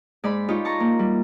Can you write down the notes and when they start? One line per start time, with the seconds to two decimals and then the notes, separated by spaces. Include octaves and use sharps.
0.24 G#2 D5 B5
0.49 D#4 F4 G4 C#5
0.65 A5 A#5 C#6
0.80 A#3
0.99 G3